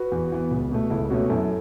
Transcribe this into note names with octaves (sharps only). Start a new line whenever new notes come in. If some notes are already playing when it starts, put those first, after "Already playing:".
Already playing: F#4 B4
E2
E3 B3
C#2
B2 A3
C#2 E4 A4
B2 A3 C#4 F#4
F#2 E4 A4